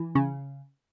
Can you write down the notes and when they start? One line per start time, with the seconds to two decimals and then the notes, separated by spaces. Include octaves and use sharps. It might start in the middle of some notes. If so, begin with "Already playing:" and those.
Already playing: E3
0.15 C#3